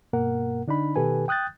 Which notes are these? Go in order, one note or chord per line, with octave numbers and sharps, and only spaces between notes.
G2 B2 A#3 A#4 F#5
D3 D4 D#4 B5
B2 D#3 G4 A4 B4 G#5
G5 D#6 F#6 G6 A6